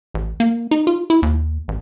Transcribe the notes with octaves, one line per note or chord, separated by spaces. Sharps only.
A1
A#3
D#4
F4
E4
D#2
A1